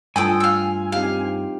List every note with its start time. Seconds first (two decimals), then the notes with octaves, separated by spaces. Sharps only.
0.16 G2 A3 F4 A4 G5 G#5 D#6
0.40 F5 E6
0.92 C4 D#4 G4 F5